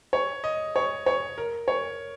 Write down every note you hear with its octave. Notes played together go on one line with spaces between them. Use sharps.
C#5
D#5
C#5
C#5
A#4
C#5